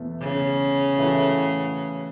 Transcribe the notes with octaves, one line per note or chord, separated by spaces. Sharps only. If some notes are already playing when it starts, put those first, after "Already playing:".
Already playing: E2 B2 A3
C#3
A2 E3 A3 F#4